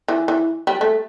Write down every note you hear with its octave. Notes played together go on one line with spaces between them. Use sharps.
E3
E3
G3
A3